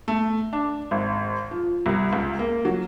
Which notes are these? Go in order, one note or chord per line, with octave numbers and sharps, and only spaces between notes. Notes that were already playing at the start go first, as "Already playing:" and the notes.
A3
D4
G#1
F3
C2
C#2
A#3
F#3